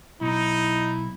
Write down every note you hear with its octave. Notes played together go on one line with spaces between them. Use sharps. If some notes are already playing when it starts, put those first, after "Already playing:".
B1 D#4 E4